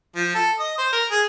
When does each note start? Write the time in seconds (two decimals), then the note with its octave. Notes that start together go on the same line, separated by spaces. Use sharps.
0.16 F3
0.35 A4
0.59 D#5
0.78 C5
0.92 A#4
1.11 G#4